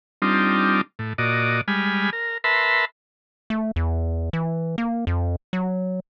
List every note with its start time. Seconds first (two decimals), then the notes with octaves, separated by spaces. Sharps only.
0.22 G3 C4 D4 D#4 F4
0.99 A2
1.18 A#2 F#4 D5 D#5
1.68 G3 G#3 G#5 B5 F6
2.13 A#4
2.44 A#4 B4 E5 A5 B5 C6
3.50 A3
3.76 E2
4.33 E3
4.78 A#3
5.07 F2
5.53 F#3